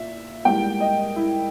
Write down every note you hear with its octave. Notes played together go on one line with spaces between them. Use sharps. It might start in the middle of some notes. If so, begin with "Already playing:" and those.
Already playing: A#2 E5
G#2 E3 G3 A#3 G5
D#5
E4